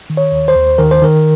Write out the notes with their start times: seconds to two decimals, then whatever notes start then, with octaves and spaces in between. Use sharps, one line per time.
0.10 D#3
0.17 C#5
0.32 D#2
0.48 C5
0.56 D#2
0.78 D#3 A#4
0.91 C5
1.01 D#3 A#4